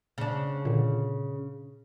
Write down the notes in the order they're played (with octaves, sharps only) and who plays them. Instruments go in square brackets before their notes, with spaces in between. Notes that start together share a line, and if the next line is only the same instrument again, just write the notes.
[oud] C#3 D4
[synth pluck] A#2 D3